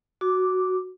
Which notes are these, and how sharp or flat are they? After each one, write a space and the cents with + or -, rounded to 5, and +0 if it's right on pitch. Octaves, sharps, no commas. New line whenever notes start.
F#4 +0 D6 -5